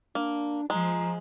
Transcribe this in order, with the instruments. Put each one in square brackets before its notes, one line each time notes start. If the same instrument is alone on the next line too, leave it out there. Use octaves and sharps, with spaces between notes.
[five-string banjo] A#3 [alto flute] D4
[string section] F3 [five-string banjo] G#3 [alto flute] A#5